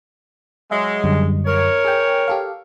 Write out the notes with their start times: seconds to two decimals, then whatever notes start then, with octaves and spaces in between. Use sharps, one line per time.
0.71 F#3 G#3 E5
1.04 F#2 D3 G3
1.45 A#4 C#5
1.85 G#4 G5
2.28 G4 A4 F5